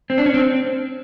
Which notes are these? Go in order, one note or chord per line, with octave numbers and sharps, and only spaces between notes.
C4
D4
C#4
C4